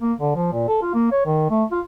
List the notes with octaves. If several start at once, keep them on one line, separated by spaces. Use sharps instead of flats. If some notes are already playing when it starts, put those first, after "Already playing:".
A#3
D3
F3
A#2
A4
F4
A#3
C#5
D#3
A3
F4